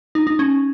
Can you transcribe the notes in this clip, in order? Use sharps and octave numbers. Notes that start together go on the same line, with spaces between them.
D#4
D#4
C#4